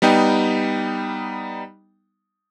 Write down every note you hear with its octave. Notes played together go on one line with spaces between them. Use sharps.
G3 B3 D#4 G5